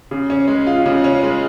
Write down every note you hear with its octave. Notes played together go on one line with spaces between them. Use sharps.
C#3
C#4
G#3
F4
C#3
C#4
G#3